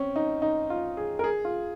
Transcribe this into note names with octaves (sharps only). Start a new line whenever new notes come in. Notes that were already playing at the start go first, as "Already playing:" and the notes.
Already playing: C4 C#4
D#4
D#4
F4
G#4
A#4
G#4
F4